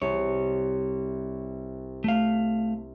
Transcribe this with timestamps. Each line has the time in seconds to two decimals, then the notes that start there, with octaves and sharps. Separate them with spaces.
0.02 C2 C#5
2.04 A3 F5